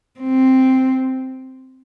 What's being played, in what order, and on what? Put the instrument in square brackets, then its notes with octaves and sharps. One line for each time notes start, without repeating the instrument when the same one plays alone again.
[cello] C4